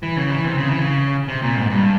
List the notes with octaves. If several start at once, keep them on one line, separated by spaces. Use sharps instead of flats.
E3
C#3
E3
C3
C#3
E3
C#3
C3
A#2
G#2
G2